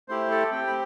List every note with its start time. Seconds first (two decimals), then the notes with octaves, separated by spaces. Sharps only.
0.08 A3 E4 G4 C5
0.31 A4
0.52 C4 G4 G5
0.67 B5